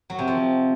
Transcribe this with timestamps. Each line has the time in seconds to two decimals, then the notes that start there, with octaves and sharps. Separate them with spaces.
0.10 F#3
0.19 C3
0.28 F3